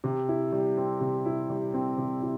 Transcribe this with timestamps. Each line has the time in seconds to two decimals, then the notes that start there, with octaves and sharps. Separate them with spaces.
0.04 C3
0.29 E4
0.53 G3
0.77 C4
1.01 C3
1.26 E4
1.50 G3
1.74 C4
1.98 C3
2.22 E4